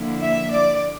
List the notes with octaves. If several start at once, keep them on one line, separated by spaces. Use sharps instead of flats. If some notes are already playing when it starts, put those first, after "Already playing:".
Already playing: D3 F3 A#3 E4
E5
D5